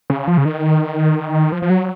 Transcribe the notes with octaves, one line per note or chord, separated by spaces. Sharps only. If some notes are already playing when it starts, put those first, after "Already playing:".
C#3
F3
C#3
D#3
F3
F3
F#3